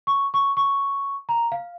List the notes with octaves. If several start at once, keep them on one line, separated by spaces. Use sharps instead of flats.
C#6
C#6
C#6
A#5
F5